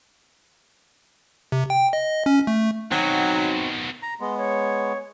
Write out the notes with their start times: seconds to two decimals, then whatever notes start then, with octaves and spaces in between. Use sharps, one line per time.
1.52 C3
1.70 G5
1.93 D#5
2.26 C#4
2.47 A3
2.92 B2 D#3 F#3 C4 D#4 F#4
4.02 A#5
4.20 G#3 B3 C6
4.38 C#5